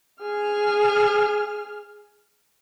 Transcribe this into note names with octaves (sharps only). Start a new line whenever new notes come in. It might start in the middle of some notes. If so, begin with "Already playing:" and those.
G#4 F6